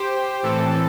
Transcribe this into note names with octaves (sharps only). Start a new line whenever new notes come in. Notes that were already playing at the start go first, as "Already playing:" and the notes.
Already playing: G4 C5
A2 E3 C4 A4